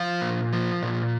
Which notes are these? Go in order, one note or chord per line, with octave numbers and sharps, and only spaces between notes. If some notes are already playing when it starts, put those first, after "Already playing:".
Already playing: F3 F5
A#2
F3
A#2